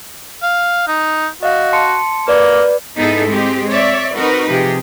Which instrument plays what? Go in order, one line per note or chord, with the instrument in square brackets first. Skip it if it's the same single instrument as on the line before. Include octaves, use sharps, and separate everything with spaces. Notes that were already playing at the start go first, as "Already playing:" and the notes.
[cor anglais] F5
D#4
[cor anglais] F#4 [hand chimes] D#5 F5
[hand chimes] A5 C6 C#7
[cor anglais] A#3 [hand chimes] B4 D5
[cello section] G#2 B3 D#4 E4 G#4 A4
G#3 C4 G4
C#5 D5 E5
C4 D#4 F#4 A#4 B4
C3 F3 G4 G#4